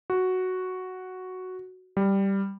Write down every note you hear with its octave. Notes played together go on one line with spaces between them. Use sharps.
F#4
G3